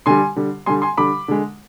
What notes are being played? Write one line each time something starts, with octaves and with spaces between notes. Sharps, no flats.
D3 G3 G#5 C6
D3 G3
D3 G3 G#5 C6
G#5 C6
D3 G3 B5 D6
D3 G#3